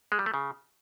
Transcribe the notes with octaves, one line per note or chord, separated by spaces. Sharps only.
G#3
G3
A3
C#3